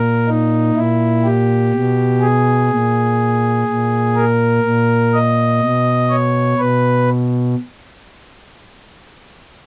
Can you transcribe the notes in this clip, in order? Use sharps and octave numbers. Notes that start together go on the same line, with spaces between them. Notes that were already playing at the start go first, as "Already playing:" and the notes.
Already playing: A#2 A#4
D#4
A#2 E4
G4
B2
G#4
A#2
A#2
A#4
A#2
D#5
B2
C#5
B2 B4